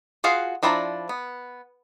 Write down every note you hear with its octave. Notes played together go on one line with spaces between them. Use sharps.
F4 F#4 G#4 F5
F3 D4 E4 D5 A#5
B3